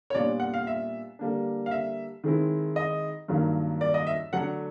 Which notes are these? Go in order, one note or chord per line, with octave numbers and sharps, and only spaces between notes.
C#5
A#2 G3 B3 D4 F4 D5
F#5
F5
E5
D3 G3 A#3 D4
F5
E5
D#3 G#3 C4 E4
D#5
G2 D#3 F#3 A#3
D5
D#5
E5
D3 F#3 A3 D4 F#5